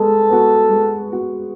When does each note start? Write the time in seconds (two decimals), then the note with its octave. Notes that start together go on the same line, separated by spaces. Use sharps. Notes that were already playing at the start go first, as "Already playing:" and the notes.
Already playing: G#3 B3 A4
0.29 B3 F#4
0.70 G#3
1.09 B3 F#4